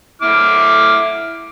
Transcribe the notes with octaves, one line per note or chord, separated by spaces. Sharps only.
E4 D6 F6